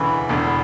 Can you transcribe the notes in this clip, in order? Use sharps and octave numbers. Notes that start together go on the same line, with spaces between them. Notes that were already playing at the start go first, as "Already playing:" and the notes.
Already playing: E1 D2 C#3 E3 B5
E1 E2 D3